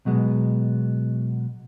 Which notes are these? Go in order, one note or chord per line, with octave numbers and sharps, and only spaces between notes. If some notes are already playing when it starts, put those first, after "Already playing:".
B2 F#3 G#3 B3